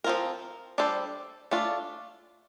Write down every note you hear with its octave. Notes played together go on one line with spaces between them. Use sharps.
F3 C4 F4 A#4
G3 D4 A4 C5
A3 D4 F4